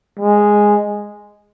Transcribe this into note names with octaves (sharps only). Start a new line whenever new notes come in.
G#3